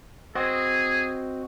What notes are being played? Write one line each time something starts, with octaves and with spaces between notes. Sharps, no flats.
C4 F#4 G#4 D#5